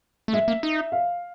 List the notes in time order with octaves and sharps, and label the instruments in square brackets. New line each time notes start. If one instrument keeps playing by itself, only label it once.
[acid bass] A3
[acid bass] G#3 [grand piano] E5
[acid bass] A#3
D#4
[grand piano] F5